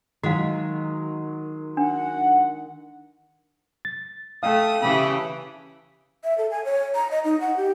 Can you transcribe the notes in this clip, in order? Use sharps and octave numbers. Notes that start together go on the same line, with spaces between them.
D#3 F#3 G#3 F#4 F5
D4 F#5
A6
A3 F5 G5 D#6
C#3 E3 G4 A5 B5
E5
A4
G#5
C#5
A#5
D#5
D#4
F#5
G4